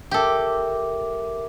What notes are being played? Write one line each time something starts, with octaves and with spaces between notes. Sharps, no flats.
G4 A4 A#4 E5 D6